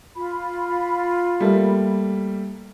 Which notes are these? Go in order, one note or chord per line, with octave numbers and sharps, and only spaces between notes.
F4 B5
G3 A3 A#3